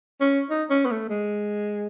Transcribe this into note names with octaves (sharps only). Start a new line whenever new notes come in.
C#4
D#4
C#4
B3
A3
G#3